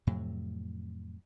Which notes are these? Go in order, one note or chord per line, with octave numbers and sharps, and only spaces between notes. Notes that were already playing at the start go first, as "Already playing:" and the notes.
F2 A2 C3 F#3